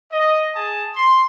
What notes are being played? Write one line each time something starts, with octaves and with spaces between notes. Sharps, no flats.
D#5
G#4 G#5 A5 D#6
C6